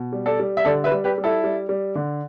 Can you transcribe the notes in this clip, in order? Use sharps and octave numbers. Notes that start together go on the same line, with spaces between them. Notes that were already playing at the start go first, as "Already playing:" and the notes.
Already playing: B2
G3
A4 D5
G3
E5
D3 A4 D5
B4 E5
G3
G4 B4
G3
E4 A4
G3
G3
D3